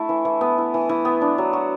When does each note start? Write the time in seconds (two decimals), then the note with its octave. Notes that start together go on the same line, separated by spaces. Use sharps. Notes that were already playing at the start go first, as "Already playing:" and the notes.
Already playing: A3 E4 A4
0.09 E3
0.25 E3
0.41 B3
0.58 E4
0.74 E3
0.89 E3
1.05 B3
1.22 D4
1.38 F#3
1.53 F#4